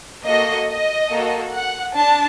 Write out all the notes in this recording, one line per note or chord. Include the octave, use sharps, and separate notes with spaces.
A#3 F#4 A4 D#5
D#5
A#3 F#4 A4
F#5
D4 A5